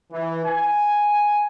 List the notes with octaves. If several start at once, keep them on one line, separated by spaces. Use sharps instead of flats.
E3
G#5